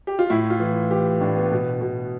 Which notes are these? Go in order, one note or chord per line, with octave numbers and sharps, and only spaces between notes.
G4
F4
A2 E4
F4
E3
E3 G4
A2 D4
B3
B2
B2